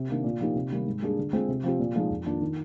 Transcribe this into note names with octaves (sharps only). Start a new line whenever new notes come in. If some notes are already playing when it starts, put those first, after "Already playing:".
Already playing: C3
D#3 A#3 D4
A#2
F3 A#3 D#4 G4
C3
D#3 G3 A#3
G#2
G3 A#3 D4 G#4
D3
G#3 C4 F4
C3
F3 C4 G4
A#2
F3 G#3 D#4
F2
D#3 A#3 D4 F4
D#3